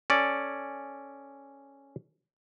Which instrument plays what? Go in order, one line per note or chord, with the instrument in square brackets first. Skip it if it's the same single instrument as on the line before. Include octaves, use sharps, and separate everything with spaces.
[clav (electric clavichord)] C#4 A4 D5